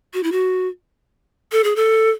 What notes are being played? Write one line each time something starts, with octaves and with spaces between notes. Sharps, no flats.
F#4
E4
F#4
A4
G#4
A4